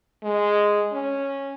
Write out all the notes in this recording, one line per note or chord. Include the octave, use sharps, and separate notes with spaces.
G#3
C#4